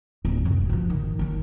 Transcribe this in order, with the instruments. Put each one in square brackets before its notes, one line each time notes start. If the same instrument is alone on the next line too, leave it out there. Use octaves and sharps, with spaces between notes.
[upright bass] D1 F2
F#2 C3
G#2 F3
D#3
D#3 C#4